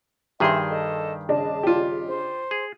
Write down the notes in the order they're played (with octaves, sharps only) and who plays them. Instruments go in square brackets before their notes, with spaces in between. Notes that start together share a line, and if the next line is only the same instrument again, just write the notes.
[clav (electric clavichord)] G2 D#3 G#4 [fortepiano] G4 A#5 C6 [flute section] E5 G#5
[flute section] A4 D#5
[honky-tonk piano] C#3 D4 D#5 [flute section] A5
[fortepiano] F4 G4
[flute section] C5
[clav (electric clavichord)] G#4